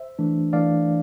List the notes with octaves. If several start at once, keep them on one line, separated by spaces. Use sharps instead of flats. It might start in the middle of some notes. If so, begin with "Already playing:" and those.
Already playing: C5 E5
E3 A3 D4
E3 A3 D4 D5 F5